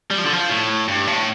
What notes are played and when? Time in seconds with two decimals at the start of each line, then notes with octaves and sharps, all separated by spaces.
0.11 G3
0.18 F3
0.26 D3
0.33 F3
0.50 A2
0.88 G2
1.07 A2